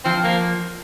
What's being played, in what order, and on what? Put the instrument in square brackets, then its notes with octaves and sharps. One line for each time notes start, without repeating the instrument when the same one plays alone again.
[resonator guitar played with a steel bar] F3 [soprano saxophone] C4
[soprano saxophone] A#3